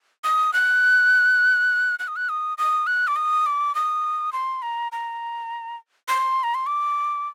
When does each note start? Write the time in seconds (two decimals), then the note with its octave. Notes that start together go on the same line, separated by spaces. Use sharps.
0.24 D#6
0.54 F#6
1.99 F#6
2.08 D#6
2.16 F#6
2.29 D#6
2.58 D#6
2.87 F#6
3.07 D6
3.16 D#6
3.46 D6
3.75 D#6
4.33 C6
4.62 A#5
4.92 A#5
6.08 C6
6.44 A#5
6.54 C6
6.67 D6